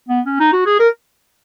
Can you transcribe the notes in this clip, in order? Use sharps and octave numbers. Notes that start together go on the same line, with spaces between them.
B3
C#4
D#4
F#4
G#4
A#4